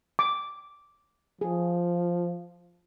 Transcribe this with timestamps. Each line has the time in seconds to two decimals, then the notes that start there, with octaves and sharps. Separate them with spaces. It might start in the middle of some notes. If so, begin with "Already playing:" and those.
0.19 D6
1.41 F3 G#4